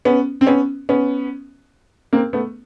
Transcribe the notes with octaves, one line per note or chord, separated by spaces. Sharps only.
B3 C#4
C4
B3 C#4
B3 C#4
A#3 C4
A3 B3